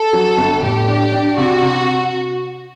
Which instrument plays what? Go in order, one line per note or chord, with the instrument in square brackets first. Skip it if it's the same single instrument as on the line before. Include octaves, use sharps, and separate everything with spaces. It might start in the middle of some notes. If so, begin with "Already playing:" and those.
Already playing: [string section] A4
[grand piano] F#3
G1
[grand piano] A2 [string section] G4
[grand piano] D4
D4
[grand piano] C3 [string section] F#4
[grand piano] C3